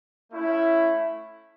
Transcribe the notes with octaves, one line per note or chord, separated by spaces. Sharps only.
A3 C#4 E4